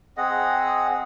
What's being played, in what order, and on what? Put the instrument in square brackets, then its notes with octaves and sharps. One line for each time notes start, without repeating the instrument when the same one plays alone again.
[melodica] C4 G#4 D#5 F#5